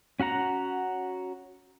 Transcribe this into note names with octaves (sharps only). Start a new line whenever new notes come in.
C#4 F#4 F#5 A#5